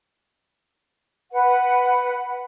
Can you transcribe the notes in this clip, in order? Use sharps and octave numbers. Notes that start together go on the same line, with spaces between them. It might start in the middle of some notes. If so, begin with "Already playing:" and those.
B4 F#5